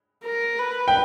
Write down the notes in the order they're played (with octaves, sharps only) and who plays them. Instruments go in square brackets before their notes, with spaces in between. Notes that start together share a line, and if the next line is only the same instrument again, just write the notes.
[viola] A#4
B4
[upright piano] G5